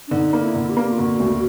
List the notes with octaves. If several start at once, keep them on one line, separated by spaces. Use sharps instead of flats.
D4
D3 D#4
A#3
E4
D3
G4
A#3
F4
D3 F#4
D2